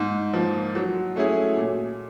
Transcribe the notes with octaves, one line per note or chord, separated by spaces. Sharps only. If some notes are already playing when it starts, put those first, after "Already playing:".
Already playing: G#2
F3 A#3
F#3
A3 C#4 E4 G#4
A#2